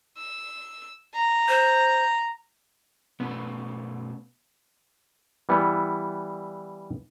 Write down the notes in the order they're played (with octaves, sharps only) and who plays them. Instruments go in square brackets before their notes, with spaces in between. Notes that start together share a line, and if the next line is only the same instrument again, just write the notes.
[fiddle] E6
A#5
[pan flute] C5
[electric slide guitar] B2 A3 C#4 [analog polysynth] B3
[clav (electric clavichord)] E3 G3 B3 E4